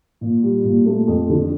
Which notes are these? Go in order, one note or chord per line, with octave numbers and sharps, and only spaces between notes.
A#2
G3
A#2
A3
F2
D3